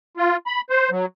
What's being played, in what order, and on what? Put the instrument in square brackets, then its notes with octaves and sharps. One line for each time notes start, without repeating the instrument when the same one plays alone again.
[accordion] F4
B5
C5
F#3